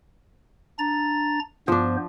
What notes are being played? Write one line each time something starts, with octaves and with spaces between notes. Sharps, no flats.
D4 A#5 A6
G2 F3 B3 D4 C5